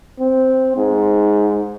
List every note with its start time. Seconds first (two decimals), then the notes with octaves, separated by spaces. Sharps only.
0.20 C4
0.77 G#2